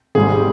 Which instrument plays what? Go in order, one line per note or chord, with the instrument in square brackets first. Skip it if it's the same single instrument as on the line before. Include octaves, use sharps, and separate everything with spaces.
[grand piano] G#1 G#2 G3 G#4